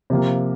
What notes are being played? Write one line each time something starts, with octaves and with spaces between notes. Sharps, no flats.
C3 F3 A#3